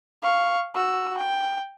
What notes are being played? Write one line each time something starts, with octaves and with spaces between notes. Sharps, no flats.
F5 C#6
F#4 E6
G5